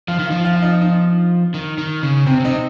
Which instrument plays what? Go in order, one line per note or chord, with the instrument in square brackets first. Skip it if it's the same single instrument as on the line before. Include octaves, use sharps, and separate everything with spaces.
[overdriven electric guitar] F3 [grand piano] F4
[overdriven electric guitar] D#3
[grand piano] F4
[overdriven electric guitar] F3
[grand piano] F4
F4
D#4
D#4
[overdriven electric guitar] D#3
D#3
C#3
[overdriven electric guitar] C3 [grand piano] C4
[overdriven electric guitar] C#3
[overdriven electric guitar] C3 [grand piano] D#4